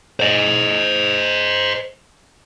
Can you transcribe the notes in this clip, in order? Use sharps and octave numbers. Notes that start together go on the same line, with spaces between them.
C5 D#5